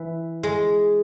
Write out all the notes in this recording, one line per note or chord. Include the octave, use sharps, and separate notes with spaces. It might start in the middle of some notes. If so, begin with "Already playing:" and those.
Already playing: E3
G#3